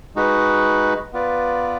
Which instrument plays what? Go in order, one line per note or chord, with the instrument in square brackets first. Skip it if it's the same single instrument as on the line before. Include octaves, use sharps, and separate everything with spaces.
[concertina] G#3 D#4 F#4 B4
B3 F4 B4 D5